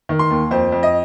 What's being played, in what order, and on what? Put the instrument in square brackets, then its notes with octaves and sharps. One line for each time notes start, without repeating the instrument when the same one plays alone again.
[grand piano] D#3
C6
D#2
F2 C5
F2
D#5